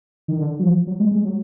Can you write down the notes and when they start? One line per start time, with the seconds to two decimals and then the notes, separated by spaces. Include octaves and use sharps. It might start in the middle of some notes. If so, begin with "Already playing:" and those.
0.28 D#3
0.39 D3
0.59 F#3
0.63 F3
0.87 F#3
1.00 G#3
1.11 G#3
1.24 F#3